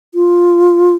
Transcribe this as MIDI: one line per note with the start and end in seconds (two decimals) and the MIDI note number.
0.14 0.95 65